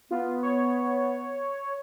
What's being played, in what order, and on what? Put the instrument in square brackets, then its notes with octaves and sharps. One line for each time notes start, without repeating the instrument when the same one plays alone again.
[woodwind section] B3 [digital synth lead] F4
[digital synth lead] C#5